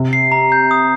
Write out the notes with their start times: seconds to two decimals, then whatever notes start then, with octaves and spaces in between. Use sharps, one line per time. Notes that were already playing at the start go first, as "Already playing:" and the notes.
Already playing: C3
0.13 C7
0.32 A#5
0.52 G6
0.71 D#6